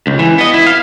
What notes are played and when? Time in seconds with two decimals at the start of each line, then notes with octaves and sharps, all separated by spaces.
0.07 C#2
0.19 E3
0.38 B3 D#5
0.54 E4
0.67 F5